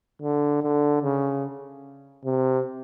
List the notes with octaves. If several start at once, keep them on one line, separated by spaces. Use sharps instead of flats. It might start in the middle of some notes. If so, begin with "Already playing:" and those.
D3
D3
C#3
C3